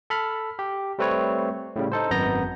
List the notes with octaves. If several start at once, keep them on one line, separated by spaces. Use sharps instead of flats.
A4 B5 F6
G4
G3 A3 C4 B4 C#5
A2 C#3 G3
D#4 A4 C5
G#1 F#2 B3 A#5 G6 A#6